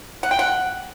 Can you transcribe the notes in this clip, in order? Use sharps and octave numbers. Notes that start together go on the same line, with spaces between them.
F#5
G5
F#5